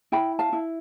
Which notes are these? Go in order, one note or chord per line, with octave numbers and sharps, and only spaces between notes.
E4 G5 B5
F5 A5
E4